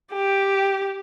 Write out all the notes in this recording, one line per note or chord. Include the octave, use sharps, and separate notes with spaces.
G4